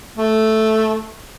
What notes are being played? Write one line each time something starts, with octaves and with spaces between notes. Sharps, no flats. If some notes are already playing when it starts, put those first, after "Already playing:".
A3